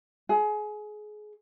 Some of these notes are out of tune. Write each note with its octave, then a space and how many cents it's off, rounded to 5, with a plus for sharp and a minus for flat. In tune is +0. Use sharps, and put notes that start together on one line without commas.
G#4 +25